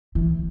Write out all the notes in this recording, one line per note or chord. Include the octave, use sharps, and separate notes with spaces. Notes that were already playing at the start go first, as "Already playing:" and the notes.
E3